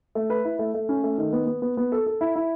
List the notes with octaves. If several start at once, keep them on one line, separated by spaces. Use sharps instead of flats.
A3
B4
E4
A3
A3
C#4
A3
D#3
B3
B3
B3
B3
A4
A4
E4
E4